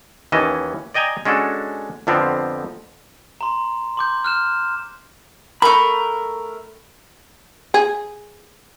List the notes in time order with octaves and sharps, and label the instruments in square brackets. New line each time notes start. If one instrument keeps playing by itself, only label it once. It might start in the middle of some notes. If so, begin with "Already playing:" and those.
[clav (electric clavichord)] D#2 E3 C#4 D#5 A5
D5 D#5 G5 G#5 A#5
G#3 C#4 D4 F#4 A4
F2 D3 F3 B3 C4
[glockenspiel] A#5 C6
C6 D6 G6
F6 F#6 E7
[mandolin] A3 A#4 [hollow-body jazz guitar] B5
[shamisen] G#4